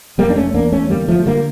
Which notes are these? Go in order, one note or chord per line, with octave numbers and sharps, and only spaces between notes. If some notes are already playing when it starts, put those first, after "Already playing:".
F1 G3 A#3
D4
A3 C#4
E2 A#3 D4
A3 C#4
D3 G3 A#3
F3 A3
D3 G3 A#3